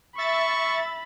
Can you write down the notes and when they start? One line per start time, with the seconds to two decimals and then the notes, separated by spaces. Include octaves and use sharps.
0.18 E5 B5 C#6 A6